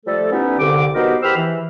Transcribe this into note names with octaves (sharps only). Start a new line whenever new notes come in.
F3 G3 A3 A4
G3 B3 C#4 D#4 E4
C2 D3 D6
B3 D#4 F#4 G4 A#4 C5
E2 G4 C5 B5 E6 F6
E3